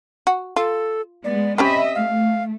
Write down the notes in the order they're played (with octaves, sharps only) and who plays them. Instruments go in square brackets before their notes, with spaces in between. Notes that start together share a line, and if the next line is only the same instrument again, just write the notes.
[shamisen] F#4
[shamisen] F4 [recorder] A4
[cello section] G#3 B3 [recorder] D5
[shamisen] C4 C#4 G4 [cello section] D#5 E5 [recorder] B5
[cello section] A3 [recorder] F5